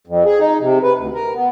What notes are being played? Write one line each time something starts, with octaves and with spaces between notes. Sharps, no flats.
F2
G#4
D#4
C3
B4
D2
A#4
B3